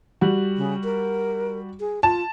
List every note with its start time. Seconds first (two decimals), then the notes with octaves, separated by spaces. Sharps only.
0.21 G3 F#4
0.57 C#3
0.84 A#4
1.80 G#4
2.03 F4 A5